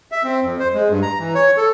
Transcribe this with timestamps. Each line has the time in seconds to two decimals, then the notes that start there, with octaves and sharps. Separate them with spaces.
0.12 E5
0.24 C4
0.44 F2
0.60 C5
0.74 G#3
0.90 G2
1.02 A#5
1.19 E3
1.35 C#5
1.57 A4